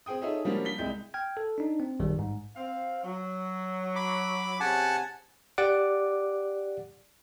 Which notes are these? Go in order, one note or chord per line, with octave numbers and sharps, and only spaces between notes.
C4 G#4 G5 D#6
D#4 F4 G#4 A4 C#5 E5
F3 G3 A#3 C#4 D4 F#4
B6 G7
C2 G#3 G6
G5 F6 G#6
A4
D4 D#4
C4
A#1 F#2 D#3 G3
G#2
C4 F5
F#3
B5 D6
C3 C#4 G#4 F#5 G#5 A5
G4 D5 F#5 D6